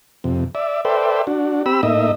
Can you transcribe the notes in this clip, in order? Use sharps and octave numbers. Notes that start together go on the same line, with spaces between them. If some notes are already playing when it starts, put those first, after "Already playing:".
F2 C3
D5 E5
A4 B4 C5 D5 E5 G5
D4 F#4
C4 G4 B5 E6
A2 A#3 D#4 D#5 E5